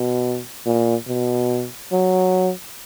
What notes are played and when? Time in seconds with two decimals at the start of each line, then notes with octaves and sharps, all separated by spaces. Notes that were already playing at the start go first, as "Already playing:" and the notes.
Already playing: B2
0.66 A#2
1.08 B2
1.92 F#3